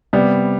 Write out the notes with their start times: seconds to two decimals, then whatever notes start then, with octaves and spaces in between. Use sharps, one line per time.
0.13 C3 G3 B3